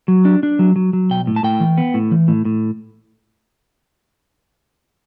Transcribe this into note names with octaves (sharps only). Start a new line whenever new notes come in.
F#3
D4
D4
F#3
F#3
F#3
B1 G5
A2
A5
A2 G5
E3
B3
A2
E3
A2
A2